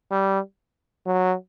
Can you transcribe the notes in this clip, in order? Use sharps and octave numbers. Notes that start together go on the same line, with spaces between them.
G3
F#3